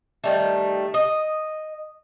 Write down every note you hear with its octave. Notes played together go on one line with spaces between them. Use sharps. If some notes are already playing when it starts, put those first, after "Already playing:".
D#3 G3 A3
D#5